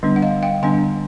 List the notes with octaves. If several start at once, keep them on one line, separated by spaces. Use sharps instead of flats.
D3 G3 B3 D4
F#5
D#5 F5
F5 G5
D3 G3 B3 D4 F#5 G#5